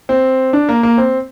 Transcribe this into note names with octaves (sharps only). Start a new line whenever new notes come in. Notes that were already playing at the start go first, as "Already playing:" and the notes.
C4
D4
A#3
A#3
C4